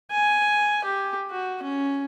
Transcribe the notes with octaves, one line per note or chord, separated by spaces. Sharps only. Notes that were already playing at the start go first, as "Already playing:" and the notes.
G#5
G4
F#4
C#4